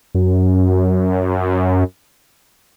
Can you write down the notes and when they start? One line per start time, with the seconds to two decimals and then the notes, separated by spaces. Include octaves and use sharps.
0.15 F#2